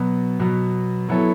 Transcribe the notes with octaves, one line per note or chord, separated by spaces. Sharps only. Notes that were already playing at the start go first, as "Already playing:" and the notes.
Already playing: B2 F#3 B3
B2 F#3 B3
F#3 B3 E4 A4 C#5